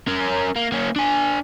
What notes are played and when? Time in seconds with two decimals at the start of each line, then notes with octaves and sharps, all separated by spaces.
0.08 C#4 A#4
0.56 A#3
0.72 A#3 C#4
0.96 D4 G#5